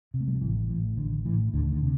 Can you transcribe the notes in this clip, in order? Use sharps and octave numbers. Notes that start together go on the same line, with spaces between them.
C3
A3
G3
F3
A1 E3
A2 E3
A1 D3
A2 E3
D2 D3
D3
C3